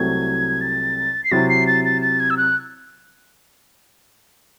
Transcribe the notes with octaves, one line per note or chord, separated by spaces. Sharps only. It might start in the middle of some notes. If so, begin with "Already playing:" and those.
Already playing: C2 C3 F#3 A3 C4 G#6
A6
C7
C3 F#3 C4 E4 A6
C7
A6
A6
A6
G#6
E6
F#6